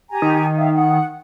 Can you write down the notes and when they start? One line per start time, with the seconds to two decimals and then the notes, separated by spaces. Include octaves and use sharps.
0.10 G4 G#5 A#5
0.22 D#3
0.55 E5 F5
0.74 F#5